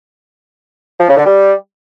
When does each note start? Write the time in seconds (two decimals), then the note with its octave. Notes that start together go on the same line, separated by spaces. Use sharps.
0.99 F3
1.08 C#3
1.17 D3
1.26 G3